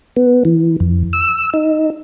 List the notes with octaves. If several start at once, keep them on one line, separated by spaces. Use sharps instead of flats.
B3
E3
F2
E6
D#4